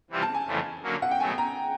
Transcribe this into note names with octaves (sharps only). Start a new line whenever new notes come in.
C3 E3 G3 C4 F4
A5
G#5
F2 C#3 E3 A3
D3 F#3 A#3 C#4
F#5
G5
B2 F#3 A3 G#5
A#5